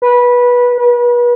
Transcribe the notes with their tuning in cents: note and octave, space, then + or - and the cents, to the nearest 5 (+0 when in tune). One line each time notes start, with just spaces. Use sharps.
B4 -15
B4 -35